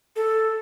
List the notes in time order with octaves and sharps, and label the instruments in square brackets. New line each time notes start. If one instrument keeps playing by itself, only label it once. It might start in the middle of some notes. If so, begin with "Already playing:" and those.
[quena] A4